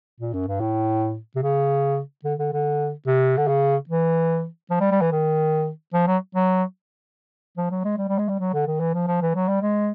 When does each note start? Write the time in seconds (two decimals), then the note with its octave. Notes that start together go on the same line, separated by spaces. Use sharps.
0.20 A#2
0.33 F#2
0.48 G2
0.60 A2
1.36 C3
1.43 C#3
2.25 D3
2.39 D3
2.53 D3
3.07 C3
3.37 D3
3.48 C#3
3.89 E3
4.71 F3
4.81 G3
4.92 G3
5.01 E3
5.12 D#3
5.94 F3
6.07 F#3
6.35 F#3
7.57 F3
7.71 F#3
7.84 G#3
7.98 G3
8.08 G3
8.19 G#3
8.29 G3
8.40 F#3
8.54 D3
8.67 D#3
8.80 E3
8.94 F3
9.08 F3
9.22 E3
9.35 F#3
9.48 G3
9.62 G#3